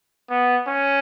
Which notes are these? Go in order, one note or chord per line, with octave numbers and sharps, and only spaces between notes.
B3
C#4